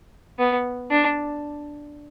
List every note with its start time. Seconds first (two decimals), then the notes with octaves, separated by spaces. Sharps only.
0.39 B3
0.90 D4